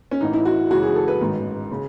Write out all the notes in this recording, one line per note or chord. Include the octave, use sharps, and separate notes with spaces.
C#4
A1 A2 E3 D#4
E4
F#4
F#2 C#3 E3 G#3 F#4
G#4
A4
B4
A1 G#2 D#3
C#3